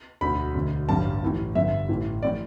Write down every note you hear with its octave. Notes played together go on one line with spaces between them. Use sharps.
E1 D2 D3 B5
E1 D2 D3
A1 G2 D3 A5
A1 A2 E3
G1 G2 D3 E5
A1 A2 E3
A2 E3 D5